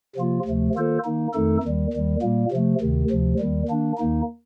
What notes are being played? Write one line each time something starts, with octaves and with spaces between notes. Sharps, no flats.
C3 F3 A#3 F4
D2 C3 F3 A3
D#3 A#3 F4 A4 C5
D#3 A#3 D#4
F2 D#3 A3 D#4 A4
D#2 D#3 G3
D#2 D#3 G3
A#2 G3 A#3
C3 F3 A3
D2 C3 D#3
D2 C3 F3
D#2 D#3 G3
D#3 A#3 D4
D#2 D#3 A#3 D#4